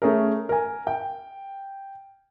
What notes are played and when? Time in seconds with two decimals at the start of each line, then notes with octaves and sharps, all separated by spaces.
0.02 A3 C#4 G#4 A#4
0.49 A#4 G#5
0.87 G5